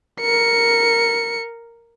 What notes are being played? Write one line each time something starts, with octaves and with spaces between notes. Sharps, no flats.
A#4 C#7